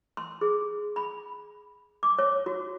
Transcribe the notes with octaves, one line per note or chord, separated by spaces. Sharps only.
C6
G#4
B5
D6
C#5
F#4